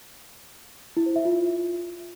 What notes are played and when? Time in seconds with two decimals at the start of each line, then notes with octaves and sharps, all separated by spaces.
0.97 E4
1.06 C5
1.16 E5
1.25 F4